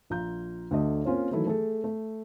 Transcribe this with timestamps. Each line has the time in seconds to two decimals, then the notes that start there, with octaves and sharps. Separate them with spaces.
0.10 A#1 F4 A#5 G6
0.71 D2 A3 D4 D#5
1.05 A#3 C4 C#4 F4 C5
1.31 D#3 E3 F#3 A3 E4 A4
1.46 A3 G#4 A4
1.84 A3